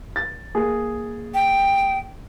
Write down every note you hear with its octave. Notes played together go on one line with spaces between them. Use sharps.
A6
A#3 G#4
G5